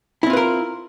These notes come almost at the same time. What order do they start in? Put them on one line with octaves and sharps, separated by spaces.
E4 C4 F4 B4 A#4